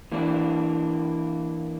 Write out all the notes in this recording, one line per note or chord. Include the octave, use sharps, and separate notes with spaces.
E3 A#3 D4